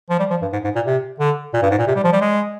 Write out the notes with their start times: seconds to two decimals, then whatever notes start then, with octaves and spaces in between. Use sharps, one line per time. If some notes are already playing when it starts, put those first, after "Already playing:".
0.10 F3
0.19 G3
0.30 F3
0.42 G2
0.53 G#2
0.64 G#2
0.75 A#2
0.86 C3
1.20 D3
1.54 A#2
1.62 G2
1.71 G#2
1.79 A#2
1.87 C3
1.95 G3
2.04 F3
2.13 G3
2.21 G#3